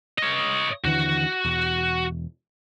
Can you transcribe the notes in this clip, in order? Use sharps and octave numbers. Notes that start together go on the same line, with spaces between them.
C#5 D#5
D#2 D3 E3 F#4
E1 E2